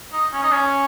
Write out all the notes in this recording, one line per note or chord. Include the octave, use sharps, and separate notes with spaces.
D#4
C#4
D#4
C#4